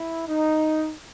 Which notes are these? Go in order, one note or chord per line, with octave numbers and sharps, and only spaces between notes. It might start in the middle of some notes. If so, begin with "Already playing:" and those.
Already playing: E4
D#4